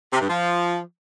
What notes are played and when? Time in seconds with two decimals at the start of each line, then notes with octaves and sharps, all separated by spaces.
0.12 C3
0.20 G2
0.29 F3